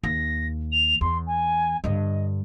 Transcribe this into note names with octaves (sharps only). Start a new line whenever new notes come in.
D#2 A#6
F7
E2 C6
G#5
G2 D3 D#5